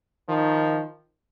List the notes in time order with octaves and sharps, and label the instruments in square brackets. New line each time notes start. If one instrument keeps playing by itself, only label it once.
[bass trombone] D#3 [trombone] F3